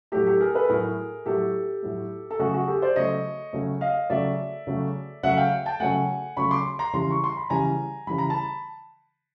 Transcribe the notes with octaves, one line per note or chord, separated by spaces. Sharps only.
A2 F#3 A3 G4 A4
G4 A4
G#4 A#4
A4 B4
A2 F#3 A3 G#4 A#4
A2 F#3 A3 G4 A4
A2 F#3 A3
A4
C#3 F#3 A3 F#4 G#4
F#4 G#4
G4 A4
C5 D5
C#3 F#3 A3 C#5 D#5
C#3 F#3 A3
D#5 F5
C#3 F#3 A3 D5 E5
C#3 F#3 A3
C#3 F#3 A3 E5 F#5
F5 G5
G5 A5
C#3 F#3 A3 F#5 G#5
C#3 F#3 A3 B5 C#6
C6 D6
A#5 C6
C#3 E3 G3 A#5 C6
C#6
C6
B5
C#3 E3 G3 G#5 A#5
C#3 E3 G3 B5
A#5
A5 B5